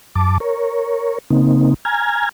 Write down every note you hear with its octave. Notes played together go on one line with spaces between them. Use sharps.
F#2 A5 D6
A#4 C#5
C#3 A#3 C4 D#4
G#5 A#5 F6 G#6